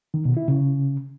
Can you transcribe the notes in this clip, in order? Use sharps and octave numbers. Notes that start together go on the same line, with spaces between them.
D#3
B2
E4
C#3